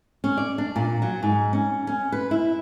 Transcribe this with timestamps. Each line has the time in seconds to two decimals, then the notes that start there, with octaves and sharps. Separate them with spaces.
0.24 C#4
0.37 D5
0.58 D4
0.76 A#2
1.02 F#3
1.23 G#2
1.53 C#4
1.87 C#4
2.12 B4
2.31 E4